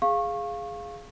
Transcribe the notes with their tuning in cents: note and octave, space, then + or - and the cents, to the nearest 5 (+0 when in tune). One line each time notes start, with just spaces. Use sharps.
G#4 +0 F5 +0 C#6 -25